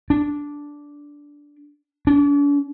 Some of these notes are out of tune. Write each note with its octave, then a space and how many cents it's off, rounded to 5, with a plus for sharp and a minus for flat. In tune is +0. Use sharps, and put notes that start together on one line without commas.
D4 -10
D4 -45